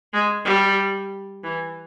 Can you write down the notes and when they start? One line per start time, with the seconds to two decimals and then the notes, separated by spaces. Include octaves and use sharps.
0.13 G#3
0.45 G3
1.44 E3